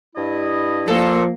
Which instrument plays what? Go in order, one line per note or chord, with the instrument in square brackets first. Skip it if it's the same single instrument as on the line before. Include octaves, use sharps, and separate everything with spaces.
[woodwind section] G2 E4 D#5
[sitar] A#2 A4 [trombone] F3 [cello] A#3